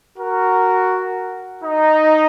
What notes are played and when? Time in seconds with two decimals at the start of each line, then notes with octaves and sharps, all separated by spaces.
0.17 F#4 A#4
1.63 D#4